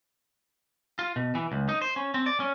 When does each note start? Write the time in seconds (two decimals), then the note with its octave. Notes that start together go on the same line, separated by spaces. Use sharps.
0.99 F4
1.16 B2
1.35 E3
1.52 C#2
1.69 D#4
1.82 C5
1.96 C#4
2.14 C4
2.26 D5
2.40 C#4